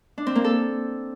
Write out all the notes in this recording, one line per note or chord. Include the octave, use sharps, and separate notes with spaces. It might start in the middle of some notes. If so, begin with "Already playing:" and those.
D4
C4
A#3
A4